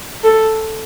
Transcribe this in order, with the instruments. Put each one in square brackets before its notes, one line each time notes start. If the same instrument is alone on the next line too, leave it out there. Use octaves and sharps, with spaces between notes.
[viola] A4